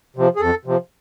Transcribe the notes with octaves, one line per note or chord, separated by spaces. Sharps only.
C3 F3
G#4
F2 A4
C3 F3